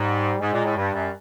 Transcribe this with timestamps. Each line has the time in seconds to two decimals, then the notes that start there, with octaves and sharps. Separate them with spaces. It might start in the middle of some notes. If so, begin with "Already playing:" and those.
Already playing: G#2 G3
0.41 G#2 G#3
0.53 A#2
0.65 A2
0.76 G2 G3
0.94 F#2